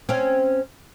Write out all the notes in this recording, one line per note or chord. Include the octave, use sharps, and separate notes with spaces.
C4 C#4